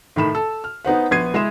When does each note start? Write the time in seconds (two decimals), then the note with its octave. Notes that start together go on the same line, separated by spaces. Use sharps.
0.16 A2 D#3 B5 E7
0.35 A4
0.64 F6
0.85 B3 D#4 C5 F#5
1.11 A#1 B3 G#6 C7 D#7
1.34 G#3 E4 C6 E7